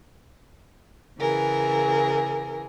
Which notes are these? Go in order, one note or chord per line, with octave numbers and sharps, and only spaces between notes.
C#3 E3 G#4 A#4